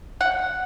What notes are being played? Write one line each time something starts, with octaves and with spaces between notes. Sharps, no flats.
F#5